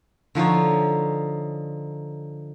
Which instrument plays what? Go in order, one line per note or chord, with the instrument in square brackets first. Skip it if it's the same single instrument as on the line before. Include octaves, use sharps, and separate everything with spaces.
[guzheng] D3 F3 D#4 C#5